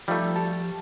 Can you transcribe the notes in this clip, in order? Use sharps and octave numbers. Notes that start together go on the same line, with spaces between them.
F3 G3 A3 D#4 F4
G4 A4 A5